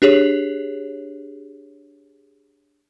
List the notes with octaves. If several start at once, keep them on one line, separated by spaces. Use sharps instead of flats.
D4 G4 G#4 C#5